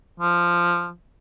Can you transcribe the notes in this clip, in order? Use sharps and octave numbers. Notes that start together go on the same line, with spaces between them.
F3